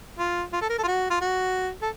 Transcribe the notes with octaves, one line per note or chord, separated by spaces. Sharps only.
F4
F4
A4
A#4
A4
F4
F#4
F4
F#4
A4